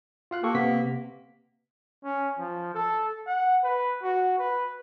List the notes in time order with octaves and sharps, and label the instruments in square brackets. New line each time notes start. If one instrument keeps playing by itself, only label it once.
[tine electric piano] F4 F5 F#6
[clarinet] A#3 [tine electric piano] G4 A4 C#6
[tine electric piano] C3 B3 B6
[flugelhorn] C#4
F3
A4
F#5
B4
F#4
B4